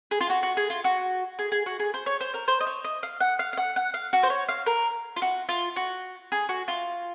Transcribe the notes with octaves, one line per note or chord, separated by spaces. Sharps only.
G#4
F4
F#4
F#4
G#4
F4
F#4
G#4
G#4
F#4
G#4
C5
C#5
C5
A#4
C5
D#5
C#5
D#5
F5
F#5
F5
F5
F#5
F#5
F5
F#4
C5
C#5
F5
A#4
F4
F#4
F4
F#4
G#4
F#4
F4